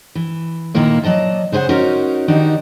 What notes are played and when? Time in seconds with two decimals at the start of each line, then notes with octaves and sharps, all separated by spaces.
0.15 E3
0.74 A#2 D3 D#3 A#3 E4
1.03 F#3 D5 D#5 A5
1.52 C#3 G#4 C5 D#5 F#5
1.69 C#4 D#4 F#4 A#4 C5
2.28 D#3 D4 D#4 F#4 G4 D5